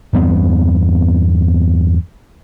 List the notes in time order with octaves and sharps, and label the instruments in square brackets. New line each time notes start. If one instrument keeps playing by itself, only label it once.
[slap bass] E2 G2 B3 C4